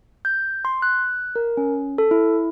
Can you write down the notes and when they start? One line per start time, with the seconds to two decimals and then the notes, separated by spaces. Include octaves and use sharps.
0.25 G6
0.65 C6
0.82 F#6
1.36 A#4
1.57 C#4
1.98 A4
2.11 E4